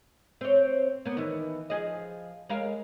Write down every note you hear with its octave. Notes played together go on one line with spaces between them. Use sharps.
C4 C#5
A#3 B3
D#3 E3
F3 G#4 D#5
G#3 A#4 F5